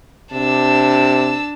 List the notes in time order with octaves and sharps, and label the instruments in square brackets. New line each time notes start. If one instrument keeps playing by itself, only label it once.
[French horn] C3 [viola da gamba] D4 [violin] A5 E6